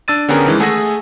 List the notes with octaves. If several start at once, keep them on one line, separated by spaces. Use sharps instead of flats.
D4 E6 A6 D#7
D3 B3 C#4 G4 G#4 A#4
D#3 E3 G#3
A3 G#4 F#5 G#5 E6 A#6